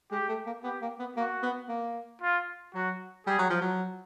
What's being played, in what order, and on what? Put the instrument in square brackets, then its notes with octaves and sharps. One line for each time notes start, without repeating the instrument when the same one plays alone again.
[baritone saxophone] G#3 [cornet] G4
[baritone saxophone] A3
A#3
[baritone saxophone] B3 [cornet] G4
[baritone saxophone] A#3
B3
[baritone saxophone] A#3 [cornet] F#4
[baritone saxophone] B3
A#3
[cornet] F4
[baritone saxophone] F#3 [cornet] F#4
[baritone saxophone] G3 [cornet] G#4
[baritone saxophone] F#3
F3
F#3